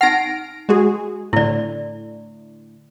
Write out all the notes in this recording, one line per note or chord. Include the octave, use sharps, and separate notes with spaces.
D#4 F#5 F6 A#6 D7
G#3 F#4 G#4
A2 D3 E4 D5